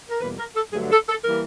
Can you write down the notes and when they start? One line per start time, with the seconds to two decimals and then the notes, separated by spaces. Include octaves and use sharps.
0.09 A#4
0.19 E2 B2 G3 A#3 B4
0.37 A#4
0.55 A4
0.72 G2 D3 F#3 A3 G#4
0.90 A4
1.08 A4
1.24 E3 G3 A#3 A#4